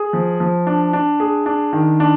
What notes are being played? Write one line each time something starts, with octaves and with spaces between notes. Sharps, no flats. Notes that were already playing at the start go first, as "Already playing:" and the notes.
Already playing: G#4
F3
F3
D4
D4
G#4
D4
D#3
D4